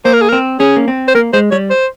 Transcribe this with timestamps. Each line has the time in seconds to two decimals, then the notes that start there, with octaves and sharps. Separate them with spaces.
0.05 A#3 C5
0.13 A#4
0.21 G#4
0.29 C4 A#4
0.60 C#4 G#4
0.76 A#3
0.88 C4
1.08 C5
1.15 A#3 A#4
1.33 G#3 C5
1.51 G3 C#5
1.70 C5